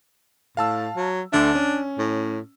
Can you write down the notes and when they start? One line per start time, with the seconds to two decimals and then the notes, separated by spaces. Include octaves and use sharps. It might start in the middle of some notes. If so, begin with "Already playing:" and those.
0.57 A2 F5 A5 E6
0.96 F#3
1.33 D2 D3 D4 E5
1.55 C#4
1.98 A2